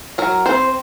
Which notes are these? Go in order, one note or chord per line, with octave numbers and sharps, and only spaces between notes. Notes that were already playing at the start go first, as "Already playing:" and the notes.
F#3 A#4
C4 C5